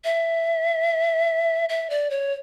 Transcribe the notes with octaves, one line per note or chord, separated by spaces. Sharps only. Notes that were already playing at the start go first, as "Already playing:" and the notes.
E5
E5
D5
C#5